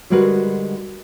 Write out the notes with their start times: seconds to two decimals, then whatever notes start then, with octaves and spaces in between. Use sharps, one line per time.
0.10 D3 G3 G#3 F#4 A#4 B4